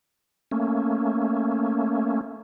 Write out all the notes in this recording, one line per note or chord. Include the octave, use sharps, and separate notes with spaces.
A3 A#3 C#4